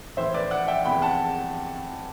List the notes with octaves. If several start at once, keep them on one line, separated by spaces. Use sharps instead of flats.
A2 E3 C5 E5
B4 D5
D5 F#5
E5 G5
E2 C3 E3 G5 B5
F#5 A5